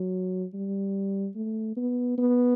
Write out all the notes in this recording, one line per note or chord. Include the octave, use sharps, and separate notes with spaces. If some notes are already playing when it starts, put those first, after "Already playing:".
Already playing: F#3
G3
A3
B3
B3